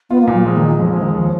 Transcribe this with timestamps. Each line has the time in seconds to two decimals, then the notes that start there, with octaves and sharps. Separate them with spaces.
0.10 B3 F4
0.21 A#3
0.28 A#2
0.34 F#3
0.45 F3 G#3
0.56 D#3
0.62 G#3
0.68 D#3
0.79 F2 F3
0.86 F#3
0.91 F3
0.96 G#3
1.02 D#3
1.14 D#2 F3